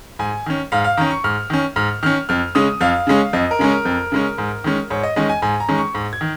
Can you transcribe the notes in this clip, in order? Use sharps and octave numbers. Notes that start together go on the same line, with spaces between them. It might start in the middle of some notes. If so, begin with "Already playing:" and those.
G#2 G#5
D#3 C#4
G#2 F5
F5
D#3 C#4 A#5
C#6
G#2 F6
D#3 C#4
G#2 F6
D#3 C#4 F6
F2 F6
C#3 G#3 C#4 D#6
F2 F5
C#3 G#3 C#4
F2 D#5
A#4
C#3 G#3 C#4
A#4
F2
C#3 G#3 C#4
G#2
D#3 G#3 C#4
G#2 C#5
D#5
D#3 G#3 C#4 D#5
G#5
G#2 G#5
A#5
D#3 G#3 C#4
C#6
G#2
G#6
D#3